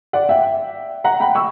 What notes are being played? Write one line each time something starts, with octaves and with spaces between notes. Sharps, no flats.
D5 F#5
E5 G5
F#5 A#5
G5 B5
C#6 E6